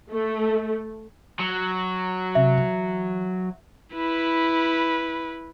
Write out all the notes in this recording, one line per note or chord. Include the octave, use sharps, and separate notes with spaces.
A3
F#3
C3 E5
E3
E4 B4